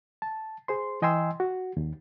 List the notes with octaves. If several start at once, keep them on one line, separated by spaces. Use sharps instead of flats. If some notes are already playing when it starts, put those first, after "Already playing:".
A5
G#4 C5 C6
E3 D#5 G5 G#5 C6 E6
F#4
D#2